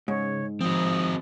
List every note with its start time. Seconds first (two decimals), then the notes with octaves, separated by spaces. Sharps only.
0.08 G#2 C#3 C#5
0.61 F3 C4 F#4 D#6